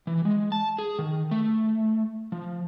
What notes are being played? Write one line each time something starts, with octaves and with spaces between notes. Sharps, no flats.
E3
G#3
A5
G#4
D#3
A3
F3